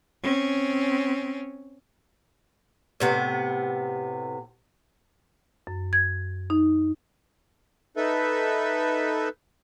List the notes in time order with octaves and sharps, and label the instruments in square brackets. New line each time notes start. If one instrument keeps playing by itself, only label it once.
[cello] C4 C#4
[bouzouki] A2 C3 B3
[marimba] F#2
G#6
D#4
[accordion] D#4 A4 B4 E5